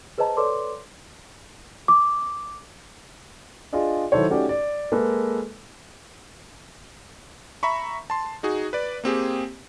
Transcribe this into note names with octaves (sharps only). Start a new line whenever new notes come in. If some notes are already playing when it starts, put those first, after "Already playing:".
G#4 B4 C5 D#5 A5 A#5
A4 B4 C#5 D5 C6 D6
D6
D4 F4 G#4 D5 D#5
D#3 F#3 E4 A4 C5 C#5
A3 C#4 D#4 F#4 G4 D5
D5
G#3 A#3 G#4 A4 B4
E5 A#5 B5 C#6
A5 C6
D#4 F#4 G#4
B4 D5
A#3 C4 G4 G#4